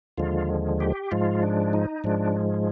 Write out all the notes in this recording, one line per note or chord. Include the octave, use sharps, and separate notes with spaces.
D#2 D3 F3 G#3 F4
G4
G#2 F3 G#3 F4
D4
D#4
G#2 F3 G#3 D4